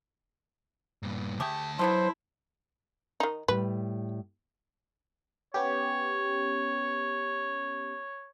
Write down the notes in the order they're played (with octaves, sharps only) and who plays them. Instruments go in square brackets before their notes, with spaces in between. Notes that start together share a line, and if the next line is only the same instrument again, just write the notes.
[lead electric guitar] G2 A#2
[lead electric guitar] D2 A5 [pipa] A3 G4 G#4
[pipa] D3 B3 A4 [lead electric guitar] F#3 [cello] E4 [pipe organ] C5
[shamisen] D#3 D#4
[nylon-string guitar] A2 G3 [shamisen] B4
[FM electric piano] B3 C#4 G4 [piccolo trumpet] C#5